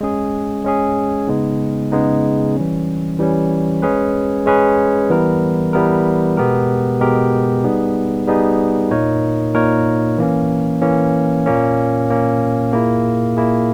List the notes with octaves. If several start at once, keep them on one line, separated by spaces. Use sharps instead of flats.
G#3 C#4 G#4
G#3 C#4 G#4
C#3 G#3 B3 D#4
C#3 G#3 B3 D#4
E3 G3 C#4
E3 G3 C#4
G#3 C#4 G#4 B4
G#3 C#4 G#4 B4
E3 G3 B3 E4 A#4
E3 G3 B3 E4 A#4
B2 G#3 B3 G4 A#4
B2 G#3 B3 G4 A#4
G3 B3 D#4 G#4
G3 B3 D#4 G#4
A#2 A#3 D#4 A#4 C#5
A#2 A#3 D#4 A#4 C#5
E3 A#3 C#4
E3 A#3 C#4
A#2 A#3 C#4
A#2 A#3 C#4
A#2 A#3 E4 G#4
A#2 A#3 E4 G#4